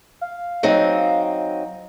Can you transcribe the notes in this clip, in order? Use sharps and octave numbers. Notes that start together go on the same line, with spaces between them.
F5
F#3 C4 D#4